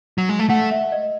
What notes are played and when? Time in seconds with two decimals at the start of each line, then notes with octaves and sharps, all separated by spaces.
0.18 F#3
0.29 G#3
0.39 A3
0.50 A3 F#5
0.71 E5
0.92 D#5